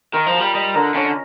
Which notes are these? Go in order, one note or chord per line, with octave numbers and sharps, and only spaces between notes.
D#3 A#4
F3
F4
G3
G3 D#5
D3 A#4
D3 C#4